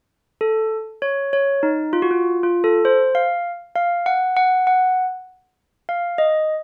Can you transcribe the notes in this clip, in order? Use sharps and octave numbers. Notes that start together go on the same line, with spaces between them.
A4
C#5
C#5
D#4
F4
F#4
F4
F4
A4
C5
F5
F5
F#5
F#5
F#5
F5
D#5